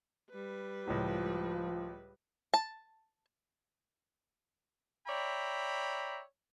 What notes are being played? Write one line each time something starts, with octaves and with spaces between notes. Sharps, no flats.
G3 B4
C#2 A2 F3 F4
A5
C#5 D5 E5 G5 A#5 B5